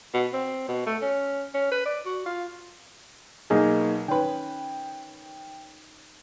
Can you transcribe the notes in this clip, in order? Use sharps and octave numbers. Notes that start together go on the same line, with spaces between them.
B2
C4
B2
A3
C#4
C#4
B4
D5
F#4
F4
B1 A#3 D#4 G#4
D#3 C#4 B4 G5